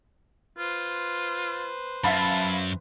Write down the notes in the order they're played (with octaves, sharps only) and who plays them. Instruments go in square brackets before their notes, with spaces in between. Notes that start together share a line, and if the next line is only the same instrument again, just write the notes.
[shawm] F4 [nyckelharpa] B4 C5
[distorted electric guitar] F#2 [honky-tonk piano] E5 F5 B5 [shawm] A5